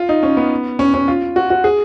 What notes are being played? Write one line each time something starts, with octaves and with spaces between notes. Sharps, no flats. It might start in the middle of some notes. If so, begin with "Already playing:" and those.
Already playing: F4
D#4
C#4
B3
C#4
C#4
F4
F#4
F#4
G#4